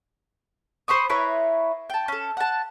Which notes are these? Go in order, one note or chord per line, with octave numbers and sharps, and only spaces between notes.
C5 B5 C#6 D#6
E4 B4 C#5 A#5
G5 A5
C#4 A4
F#5 A5